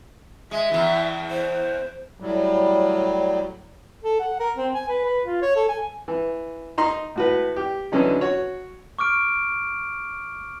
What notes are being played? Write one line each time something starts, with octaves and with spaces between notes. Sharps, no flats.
G#3 E5
E2 E3
C5
A2 F#3 G3
A4
F#5
A#4
C4
G#5
B4
B4
F4
C#5
A4
G#5
E3
D#4 A#5 C6
A2 F#4 B4
G4
D3 E3 F#3 C#4 D#4
F#4 C#5
C#6 D6 F6 D7